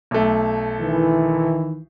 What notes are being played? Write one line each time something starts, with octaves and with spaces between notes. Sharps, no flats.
B1 A3
D#3 E3